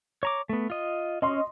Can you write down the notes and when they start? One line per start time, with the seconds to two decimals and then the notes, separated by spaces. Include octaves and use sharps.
0.23 C#5 A#5 D6
0.49 A3 B3
0.70 F4 D#5
1.22 C#4 D#5 C6